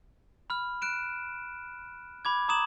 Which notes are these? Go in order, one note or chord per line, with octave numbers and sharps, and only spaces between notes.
B5 F6
F#6 D7 E7
B5 D6 G#6
A#5 D6 D#6 G#6 E7 F#7